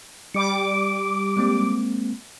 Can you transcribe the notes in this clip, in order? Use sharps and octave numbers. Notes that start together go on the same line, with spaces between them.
G3 D6 C#7
G#3 A#3 C4